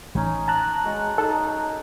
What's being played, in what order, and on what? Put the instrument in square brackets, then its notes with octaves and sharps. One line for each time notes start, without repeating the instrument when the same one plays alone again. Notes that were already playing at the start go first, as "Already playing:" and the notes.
[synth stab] A1 [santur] C#4 D#4 G#5
[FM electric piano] A5 A#5 F#6
[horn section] G#3 [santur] F#4
[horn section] D#4 [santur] G#4 D#6 [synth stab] A4